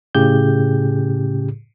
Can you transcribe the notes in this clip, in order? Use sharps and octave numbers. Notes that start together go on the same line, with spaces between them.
A2 C#3 G4 G#4 G6